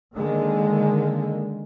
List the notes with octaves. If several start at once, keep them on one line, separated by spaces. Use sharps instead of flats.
D3 D#3 G#3 A#3